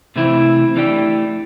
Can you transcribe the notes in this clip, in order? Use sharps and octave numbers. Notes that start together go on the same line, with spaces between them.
C3 E3 A3 C4 E4
E3 A3 D4 G4